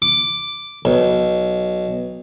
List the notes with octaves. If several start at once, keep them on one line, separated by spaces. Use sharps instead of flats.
D6
B1